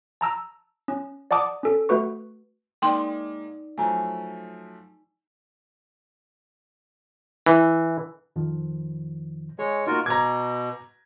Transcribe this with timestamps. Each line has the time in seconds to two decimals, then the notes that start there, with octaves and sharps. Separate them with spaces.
0.21 A5 A#5 E6
0.88 C#4
1.31 D5 F#5 A5 D6 D#6
1.63 C#4 A4
1.89 A3 F#4 B4 C#6
2.82 G#3 A#3 D#4 D5 G5 C6
3.78 F3 F#3 A3 G#5 A#5
7.46 E3
8.36 F2 D#3 F3
9.59 G#3 G#4 C#5
9.87 A#3 D#4 F4 F#4 A#4
10.06 B2 A#5 D6 G#6